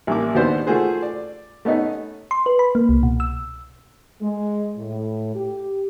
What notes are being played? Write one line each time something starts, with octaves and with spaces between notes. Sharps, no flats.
A1 G3 A#3 E4 D6
D#2 B2 B3 D4 C5 D5
A3 F4 F#4 G#4 C5
D5
A3 B3 C#4 D#4
C6
B4
B5
A#3
C2
B2
E6
G#3
A2
G4